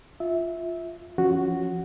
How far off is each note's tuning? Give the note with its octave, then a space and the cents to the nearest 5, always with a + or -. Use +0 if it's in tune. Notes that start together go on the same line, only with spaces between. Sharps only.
F4 +0 E5 -15
F3 -10 C#4 +0 F#4 +0